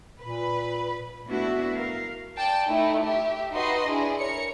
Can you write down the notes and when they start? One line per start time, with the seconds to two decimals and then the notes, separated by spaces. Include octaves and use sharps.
0.21 A#2 B4
1.26 A3 B3 D4 E4 F#4
1.76 A#4 F5
2.36 D5 G5 A5
2.67 A3 D#4 E4
3.05 G4 E5
3.52 D#4 F#4 B4 D#5 C6
3.84 D4 E4 G#4
4.18 A#4 C#5 C#7